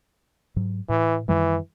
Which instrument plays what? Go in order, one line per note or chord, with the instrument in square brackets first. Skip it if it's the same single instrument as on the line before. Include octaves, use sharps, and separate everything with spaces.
[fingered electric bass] G#2 F#3
[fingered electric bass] A2 [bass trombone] E3
[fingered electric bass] F#2 D#3 G3 [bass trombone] E3